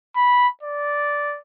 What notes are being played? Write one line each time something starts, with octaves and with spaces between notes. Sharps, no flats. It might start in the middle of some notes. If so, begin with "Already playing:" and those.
B5
D5